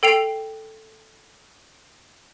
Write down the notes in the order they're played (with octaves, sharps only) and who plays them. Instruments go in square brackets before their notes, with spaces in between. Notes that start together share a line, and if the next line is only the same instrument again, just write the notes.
[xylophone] A4 G5 C7 F7